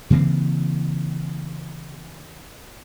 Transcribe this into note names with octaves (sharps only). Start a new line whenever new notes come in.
C#3 E3 A#3 C4